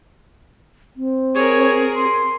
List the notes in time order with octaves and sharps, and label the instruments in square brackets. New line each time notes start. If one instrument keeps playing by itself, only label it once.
[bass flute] C4
[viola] G#4 A#4 [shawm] C#5
[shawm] C6